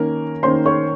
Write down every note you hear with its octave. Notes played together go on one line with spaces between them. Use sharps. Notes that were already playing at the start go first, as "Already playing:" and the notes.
Already playing: D#3 A#3 C#4 A#4
D#3 A#3 C#4 C5 C6
C#5 C#6